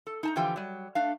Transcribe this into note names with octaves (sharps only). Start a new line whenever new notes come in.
A4
D#4 A5 A#5
D3 E3 F3 F4 G4 G5
F#3 G3
A3 D4 F5